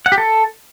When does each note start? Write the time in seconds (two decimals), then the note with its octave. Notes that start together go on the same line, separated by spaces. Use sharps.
0.06 F#5
0.12 G4
0.18 A4